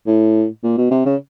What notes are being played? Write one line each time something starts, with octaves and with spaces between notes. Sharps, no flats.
A2
A#2
B2
C3
C#3